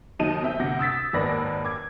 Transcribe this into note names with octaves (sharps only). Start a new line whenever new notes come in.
D#2 F#3 D#4 A5 D#7
C4 E5 G6
D2 C3 G6 A#6
D#6 E6 A6 B6
G#1 D#2 A#3 B4 D5 A#6
D6 G#6